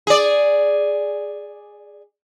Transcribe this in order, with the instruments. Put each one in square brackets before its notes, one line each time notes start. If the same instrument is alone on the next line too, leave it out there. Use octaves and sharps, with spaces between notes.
[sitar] G#4 D5